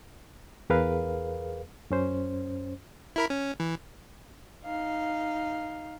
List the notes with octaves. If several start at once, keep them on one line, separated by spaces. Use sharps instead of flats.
E2 G#4 A#4 B4 F5
F#2 C#4 C5
E4 A#4 B5
C#4
E3
D#4 F5